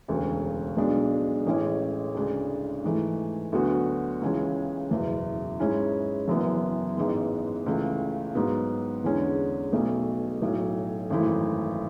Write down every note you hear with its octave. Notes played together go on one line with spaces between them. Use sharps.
E1 D2 C#3
B1 B2 G#3 D4
A1 A2 G#3 C#4
D2 C#3 G#3 D4
G#2 E3 A3
D2 D3 F#3 B3 F#4
C#2 C#3 E3 G#3 C#4
F#1 E2 B2
G#2 G#3 C#4 E4
F#1 F#2 E3 B3
A1 G#2 G#3 B3
C#2 C#3 E3 A3
G#2 F#3 B3
E2 D3 G#3 C#4
B1 B2 A3
B1 A2 F#3
G#1 F#2 E3 A3 E4